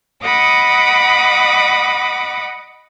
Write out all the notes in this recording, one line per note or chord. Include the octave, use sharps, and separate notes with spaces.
D#5 F#5 B5 D6 D#6